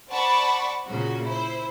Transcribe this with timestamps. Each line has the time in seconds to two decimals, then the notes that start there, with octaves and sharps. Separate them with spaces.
0.10 C5 D5 F#5 A5 B5 C#6
0.88 A#2 C#3 F#4
1.24 E4 C5